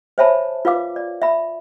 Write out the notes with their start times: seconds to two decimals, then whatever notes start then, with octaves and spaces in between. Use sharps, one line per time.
0.18 C5 C#5 E5 G#5 A5 B5
0.65 F4 B4 F5 D6
0.96 D5
1.22 E5 B5